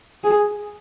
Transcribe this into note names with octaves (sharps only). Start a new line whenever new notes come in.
G#4